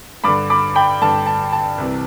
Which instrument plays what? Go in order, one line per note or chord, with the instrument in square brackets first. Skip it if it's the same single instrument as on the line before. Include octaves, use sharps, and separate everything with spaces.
[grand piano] G2 B5 D6
D3
B5 D6
G5 B5
G2 D3 A5
A5
A5
C2 C3 E3